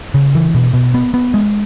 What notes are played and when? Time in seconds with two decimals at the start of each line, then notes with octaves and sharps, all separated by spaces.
0.14 C#3
0.35 E3
0.54 B2
0.74 B2
0.94 B3
1.14 B3
1.34 G#3